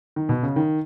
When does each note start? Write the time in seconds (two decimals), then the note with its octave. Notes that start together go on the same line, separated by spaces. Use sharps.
0.16 D#3
0.29 B2
0.43 C#3
0.56 D#3